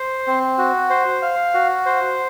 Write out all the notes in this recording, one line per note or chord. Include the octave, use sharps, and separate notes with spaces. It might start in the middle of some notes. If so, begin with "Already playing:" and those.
Already playing: C5
C4
F#4
C5
F5
F#4
C5